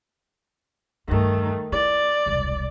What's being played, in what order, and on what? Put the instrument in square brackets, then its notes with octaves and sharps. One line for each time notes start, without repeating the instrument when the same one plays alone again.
[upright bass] E2 G2 [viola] D#3 A3
[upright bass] E4 [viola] D5
[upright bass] E1 C2